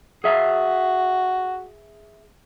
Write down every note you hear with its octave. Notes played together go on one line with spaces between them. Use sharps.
F#4 G#4 E5 F5